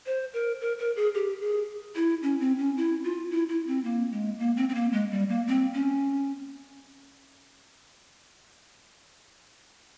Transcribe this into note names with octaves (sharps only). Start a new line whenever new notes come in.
C5
A#4
A#4
A#4
G#4
G4
G#4
E4
C#4
C4
C#4
E4
F4
E4
E4
C4
A#3
G#3
A#3
C4
C4
A#3
G#3
G3
A#3
C4
C#4